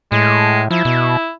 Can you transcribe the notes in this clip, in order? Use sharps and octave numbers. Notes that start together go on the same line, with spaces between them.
A2 G#3
F3 E4
B2